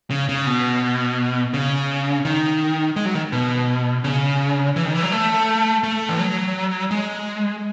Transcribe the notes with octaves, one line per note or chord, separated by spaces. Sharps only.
C#3
C#3
B2
C#3
D#3
G#3
F#3
D#3
B2
C#3
E3
D#3
E3
F#3
A3
A3
E3
F#3
G#3